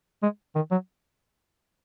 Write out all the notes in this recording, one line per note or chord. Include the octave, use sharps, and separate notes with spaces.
G#3
D#3
F#3